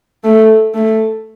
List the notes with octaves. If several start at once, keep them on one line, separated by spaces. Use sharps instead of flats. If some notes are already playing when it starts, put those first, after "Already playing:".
A3
A3